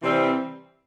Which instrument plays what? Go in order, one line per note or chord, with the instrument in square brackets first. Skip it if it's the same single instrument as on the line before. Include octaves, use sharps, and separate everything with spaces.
[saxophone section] C3 E3 G3 C4